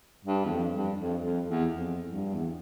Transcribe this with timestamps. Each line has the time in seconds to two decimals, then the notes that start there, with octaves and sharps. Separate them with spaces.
0.25 G2
0.45 E2
0.50 F2
0.74 G2
0.99 F2
1.22 F2
1.48 E2
1.71 F2
2.08 G2
2.34 E2